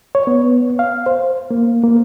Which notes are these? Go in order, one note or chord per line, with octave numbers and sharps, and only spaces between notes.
C#5
B3
F5
C5
A#3
A#3